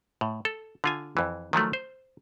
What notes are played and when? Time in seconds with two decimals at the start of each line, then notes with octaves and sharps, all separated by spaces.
0.21 A2
0.45 A4
0.84 D3 F4 G#5
1.17 F2 E3
1.53 D#3 F3 F#3 A3
1.73 C5